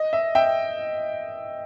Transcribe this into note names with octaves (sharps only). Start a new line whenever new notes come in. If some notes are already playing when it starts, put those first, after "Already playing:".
Already playing: D#5
E5
E5 G5